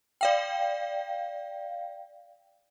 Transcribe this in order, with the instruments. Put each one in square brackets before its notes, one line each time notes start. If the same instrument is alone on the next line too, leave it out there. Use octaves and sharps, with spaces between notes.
[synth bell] D5 F5 G5